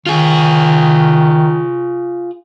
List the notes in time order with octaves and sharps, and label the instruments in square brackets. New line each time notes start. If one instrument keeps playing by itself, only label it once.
[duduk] D#3 [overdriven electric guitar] F4 G#4